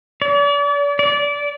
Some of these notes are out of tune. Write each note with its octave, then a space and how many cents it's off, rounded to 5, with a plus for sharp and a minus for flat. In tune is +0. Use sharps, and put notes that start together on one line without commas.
D5 -40
D5 -20